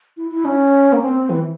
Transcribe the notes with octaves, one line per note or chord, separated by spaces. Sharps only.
E4
E4
C#4
A#3
C4
E3